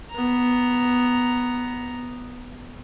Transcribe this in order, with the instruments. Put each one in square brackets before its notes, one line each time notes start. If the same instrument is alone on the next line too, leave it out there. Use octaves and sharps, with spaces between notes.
[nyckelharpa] B3 A#5